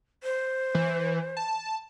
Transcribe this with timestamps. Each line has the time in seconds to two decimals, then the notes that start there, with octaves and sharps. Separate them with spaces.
0.24 C5
0.75 E3
1.37 A5